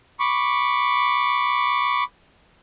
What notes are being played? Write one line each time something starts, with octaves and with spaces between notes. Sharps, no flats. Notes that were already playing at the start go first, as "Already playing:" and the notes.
B5 C#6 D6